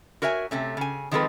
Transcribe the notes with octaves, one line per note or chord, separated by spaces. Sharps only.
F#4 A#4 C#5 E5 G#5
C3 A3 C#4
C#3 G#5
D#3 F3 G#3 C4 A4 B4